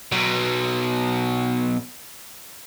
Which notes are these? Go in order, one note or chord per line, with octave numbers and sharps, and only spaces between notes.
B2 F#3